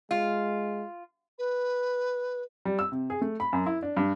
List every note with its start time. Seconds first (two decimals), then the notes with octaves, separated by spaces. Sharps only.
0.11 G#3 F4
1.38 B4
2.65 G3
2.79 E6
2.92 C3
3.10 G#4
3.21 A3
3.40 B5
3.53 F#2
3.66 E4
3.83 D4
3.97 G2